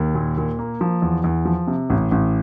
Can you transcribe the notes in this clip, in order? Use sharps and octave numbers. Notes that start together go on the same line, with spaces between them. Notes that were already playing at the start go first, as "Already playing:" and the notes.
Already playing: D#2
A#2
A#2
A#3
F3
E2
E2
F3
C3
A1
A1